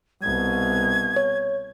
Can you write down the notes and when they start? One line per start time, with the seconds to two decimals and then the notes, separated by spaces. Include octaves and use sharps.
0.22 C2 B2 G#6
1.16 C#5